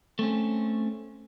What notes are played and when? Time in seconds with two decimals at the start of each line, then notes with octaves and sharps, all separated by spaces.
0.19 A3 C4 C#4